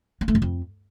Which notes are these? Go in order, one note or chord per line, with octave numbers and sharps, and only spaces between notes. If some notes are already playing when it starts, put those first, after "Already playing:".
A#3
A3
F#2
F2